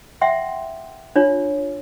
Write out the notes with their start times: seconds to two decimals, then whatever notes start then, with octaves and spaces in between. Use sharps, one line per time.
0.21 E5 F#5 G5 C6
1.16 D4 F4 C#5